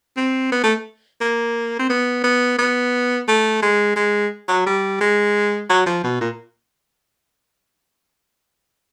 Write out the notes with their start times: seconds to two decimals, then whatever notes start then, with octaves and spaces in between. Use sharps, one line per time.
0.17 C4
0.52 B3
0.63 A3
1.21 A#3
1.79 C4
1.90 B3
2.24 B3
2.58 B3
3.28 A3
3.62 G#3
3.96 G#3
4.48 F#3
4.66 G3
5.01 G#3
5.70 F#3
5.86 F3
6.04 B2
6.21 A#2